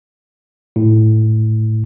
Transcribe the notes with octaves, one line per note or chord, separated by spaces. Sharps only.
A2